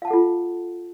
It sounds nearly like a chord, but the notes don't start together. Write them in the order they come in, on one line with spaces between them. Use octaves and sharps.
F5 A5 F#5 A4 F4